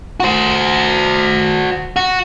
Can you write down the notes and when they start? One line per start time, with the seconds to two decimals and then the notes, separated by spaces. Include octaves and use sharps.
0.20 F#4 C5
1.96 F#4